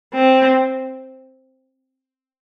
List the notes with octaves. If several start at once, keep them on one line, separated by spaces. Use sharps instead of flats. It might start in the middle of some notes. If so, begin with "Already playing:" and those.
C4